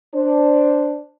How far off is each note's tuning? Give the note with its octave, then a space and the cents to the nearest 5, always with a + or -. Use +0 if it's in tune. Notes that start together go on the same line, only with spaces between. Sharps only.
D4 +0 C5 +0